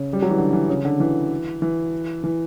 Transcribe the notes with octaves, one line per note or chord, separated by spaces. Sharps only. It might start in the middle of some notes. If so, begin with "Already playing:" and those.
Already playing: C#3
G3
F#3
E3
D3
E3
C#3
D3
E3
E3
E3